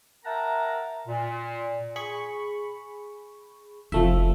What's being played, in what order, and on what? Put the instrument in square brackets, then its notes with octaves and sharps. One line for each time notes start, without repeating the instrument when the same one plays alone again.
[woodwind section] A#4 E5 F#5 G5 A5 A#5
A#2
[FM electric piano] G#4 B5 C#6
[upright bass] F1 [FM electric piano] F3 A3 E5